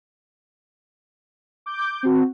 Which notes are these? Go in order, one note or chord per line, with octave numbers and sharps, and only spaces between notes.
D6 G6
C4 F#4